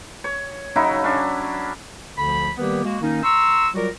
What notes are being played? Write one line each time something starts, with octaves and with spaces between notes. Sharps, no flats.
C#5
C#3 F#3 D#4 E4
C#4 D4
D2 D3 F3 B5
D#3 G3 A#3 B3 G4 B4
G#3 A#3 F#4
D#3 A#3 C#4 D#4
A#5 C6 C#6 E6
F#3 G3 F4 F#4 A#4 D5